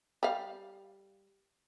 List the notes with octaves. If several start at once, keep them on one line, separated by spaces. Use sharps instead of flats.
G3 F5